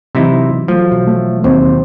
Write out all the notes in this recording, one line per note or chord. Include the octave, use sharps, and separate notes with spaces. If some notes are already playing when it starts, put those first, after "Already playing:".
C3 E3 F#3 D#4 E4
F3 F#3 A3
B2
A3
D#2 D#3 C4 D#4 C5